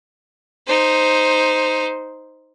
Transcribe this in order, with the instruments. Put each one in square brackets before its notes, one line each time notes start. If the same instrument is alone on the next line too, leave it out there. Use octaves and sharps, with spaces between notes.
[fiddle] D#4 C5